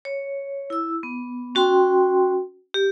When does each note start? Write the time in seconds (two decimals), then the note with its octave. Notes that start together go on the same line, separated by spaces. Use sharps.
0.05 C#5
0.70 E4 E6
1.03 B3
1.55 C#4 F#4 G5 C6
2.74 G4